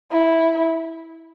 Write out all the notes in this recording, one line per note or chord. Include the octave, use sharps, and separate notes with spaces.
E4